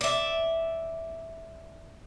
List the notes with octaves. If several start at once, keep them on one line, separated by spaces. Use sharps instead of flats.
D5 E5